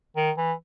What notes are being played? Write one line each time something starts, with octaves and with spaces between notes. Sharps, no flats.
D#3
E3